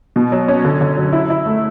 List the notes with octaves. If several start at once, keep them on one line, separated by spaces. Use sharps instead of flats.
B2
F#3
C#4
D3
D3
F#3
E4
E4
A3